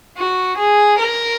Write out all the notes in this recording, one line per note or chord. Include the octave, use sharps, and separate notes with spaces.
F#4
G#4
A#4